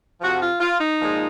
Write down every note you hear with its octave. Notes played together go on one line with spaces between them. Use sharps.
F2 C3 F3 F#4
F4
F4
D#4
A#2 F3 G#3